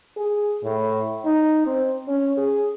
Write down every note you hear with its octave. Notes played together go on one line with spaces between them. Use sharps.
G#4
A2
D#4
C4
C#4
G#4